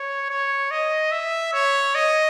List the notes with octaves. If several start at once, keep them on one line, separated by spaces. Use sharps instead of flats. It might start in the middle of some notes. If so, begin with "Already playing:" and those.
Already playing: C#5
C#5
D#5
E5
C#5
D#5